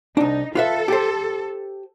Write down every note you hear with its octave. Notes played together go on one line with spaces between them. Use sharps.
C2 D4 D#4
F4 A4 B4 E5
G4 C5